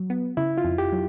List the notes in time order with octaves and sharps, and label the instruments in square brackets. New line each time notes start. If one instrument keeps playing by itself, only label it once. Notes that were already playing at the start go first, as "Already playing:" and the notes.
Already playing: [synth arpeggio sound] F#3
B3
[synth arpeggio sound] C#3 [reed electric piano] E4
[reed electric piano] F4
[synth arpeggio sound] F2
[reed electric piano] G4
[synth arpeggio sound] F#3